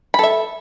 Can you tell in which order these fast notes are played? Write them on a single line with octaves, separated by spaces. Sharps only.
B5 A4 E5